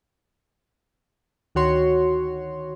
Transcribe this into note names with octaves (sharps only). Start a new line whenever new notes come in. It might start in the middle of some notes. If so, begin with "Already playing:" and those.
D2 D#3 F#4 C#5 C6